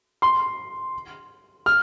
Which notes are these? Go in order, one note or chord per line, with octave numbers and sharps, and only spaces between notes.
C6
F6